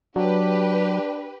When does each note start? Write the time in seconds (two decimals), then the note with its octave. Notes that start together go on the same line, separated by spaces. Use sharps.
0.16 F#3 D4 G4 B4